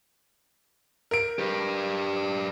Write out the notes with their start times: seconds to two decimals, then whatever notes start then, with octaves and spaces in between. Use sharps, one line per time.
1.11 A#4 D7
1.39 G4 B4